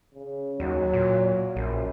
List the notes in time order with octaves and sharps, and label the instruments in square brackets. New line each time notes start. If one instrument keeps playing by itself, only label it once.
[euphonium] C#3
[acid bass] D#2 [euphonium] F#3
[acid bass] A#2
[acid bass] A#1 [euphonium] F#2